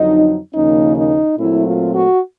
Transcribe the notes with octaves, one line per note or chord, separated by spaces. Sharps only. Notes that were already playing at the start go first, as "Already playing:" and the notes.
Already playing: F2 D3 F#3 D#4
D#2 C#3 F3 A#3 C#4 D#4
D#4
A#2 F#3 A3 C4 E4
F4
F#4